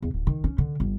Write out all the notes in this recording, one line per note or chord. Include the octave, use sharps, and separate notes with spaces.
E2
D1
D#3
C#4
D3
G1